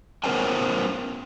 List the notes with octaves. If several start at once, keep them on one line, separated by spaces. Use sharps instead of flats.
B3 C#4 A#4 C5 G5 G#5